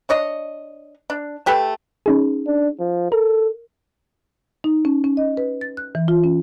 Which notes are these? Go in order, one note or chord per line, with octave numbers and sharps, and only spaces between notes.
D4 C#5 D#5
D4
A3 G4 A4 B4
C#4 D#4 G#4
D4
F3
A4 A#4
D#4
C#4
C#4
D#5
B4
A6
F#6
E3
F4
C#4